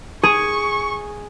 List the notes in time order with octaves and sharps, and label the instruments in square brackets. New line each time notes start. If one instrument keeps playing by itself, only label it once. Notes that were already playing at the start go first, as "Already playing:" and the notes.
[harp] G#4 [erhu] C#6